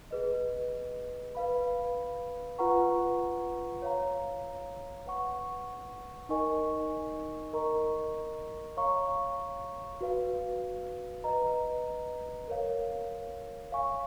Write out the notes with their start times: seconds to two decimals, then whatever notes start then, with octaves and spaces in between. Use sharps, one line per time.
0.11 G#4 B4 D#5
1.35 B4 F5 B5
2.58 F4 B4 F#5 A#5 C#6
3.82 C#5 F5 A#5
5.06 B4 F#5 C#6
6.29 D#4 A#4 D#5 G#5 C#6
7.53 A#4 D#5 A#5 C#6
8.77 C#5 F5 A#5 C#6
10.01 F#4 B4 F5
11.24 B4 D#5 A#5
12.48 A#4 C#5 F5
13.72 C#5 F5 G#5 C#6